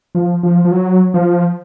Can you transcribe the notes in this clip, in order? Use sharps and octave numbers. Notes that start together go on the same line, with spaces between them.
F3
F3
F3
F#3
F3